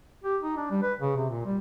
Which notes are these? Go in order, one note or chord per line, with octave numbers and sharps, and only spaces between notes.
G4
D#4
D4
G3
B4
C#3
C3
A#2
G3